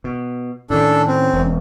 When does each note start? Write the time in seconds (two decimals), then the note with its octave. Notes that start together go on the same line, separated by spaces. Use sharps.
0.04 B2
0.70 A2 D#3 C#4 D4 A4
1.08 C4
1.33 E1